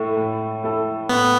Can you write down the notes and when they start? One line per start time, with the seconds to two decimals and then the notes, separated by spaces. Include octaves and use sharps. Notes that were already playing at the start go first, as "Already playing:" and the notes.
Already playing: A2 A3 E4 A4
0.17 A2
0.64 A3 E4 A4
1.09 A2 B3